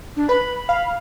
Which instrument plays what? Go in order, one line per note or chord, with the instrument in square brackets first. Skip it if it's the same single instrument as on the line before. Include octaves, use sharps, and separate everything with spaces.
[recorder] D4
[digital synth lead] B4 [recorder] B5
[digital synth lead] F5